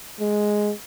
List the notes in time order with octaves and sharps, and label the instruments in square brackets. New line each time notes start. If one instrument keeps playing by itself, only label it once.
[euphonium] G#3